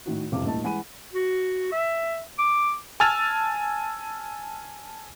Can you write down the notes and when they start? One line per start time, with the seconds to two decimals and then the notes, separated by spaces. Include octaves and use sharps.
0.06 A2 D#3 F#4
0.32 E1 F2 C3 E3 F5 D6
0.44 D#1 A#1 A3 E4 D#5 A5
0.63 E3 G#3 F#5 G#5 B5 D#7
1.13 F#4
1.72 E5
2.39 D6
3.00 G#5 A5 E6 F6 A6 F7